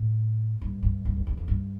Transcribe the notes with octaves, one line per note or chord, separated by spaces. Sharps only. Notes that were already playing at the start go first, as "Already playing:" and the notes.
Already playing: A2
G2
G2
G2
F2
E2
F2
G2